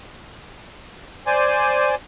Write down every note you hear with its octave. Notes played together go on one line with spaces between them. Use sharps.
C5 D5 G#5